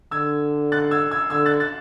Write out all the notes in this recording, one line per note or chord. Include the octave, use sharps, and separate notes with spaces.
D3 E6 G#6
F#6 A6
E6 G#6
E6 G#6
D3 E6 G#6
F#6 A6
F#6 A6